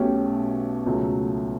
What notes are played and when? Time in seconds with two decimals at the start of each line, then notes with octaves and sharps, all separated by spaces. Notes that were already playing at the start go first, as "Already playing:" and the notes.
Already playing: B1 B2 A3 C#4 G4
0.86 C#2 B2 F#3 A3